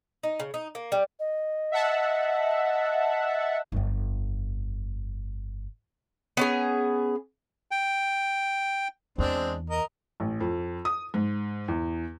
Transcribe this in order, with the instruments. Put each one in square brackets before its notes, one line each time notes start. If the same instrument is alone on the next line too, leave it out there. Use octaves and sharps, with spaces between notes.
[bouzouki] D#4
C#3
D#4
A#3
G3
[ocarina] D#5
[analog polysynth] E5 F#5 A5
[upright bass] G1 F2
[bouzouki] B3 C#4 G#4
[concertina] G5
[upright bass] E2 [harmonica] G#3 C4 D4
[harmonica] A#4 D#5
[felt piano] A1
F2
D#6
G#2
E2